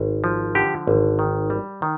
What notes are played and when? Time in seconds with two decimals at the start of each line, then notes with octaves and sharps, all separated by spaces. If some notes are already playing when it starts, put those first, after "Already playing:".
Already playing: G#1
0.24 F3
0.55 D3 G4
0.87 G#1
1.19 D#3
1.50 G3
1.82 D#3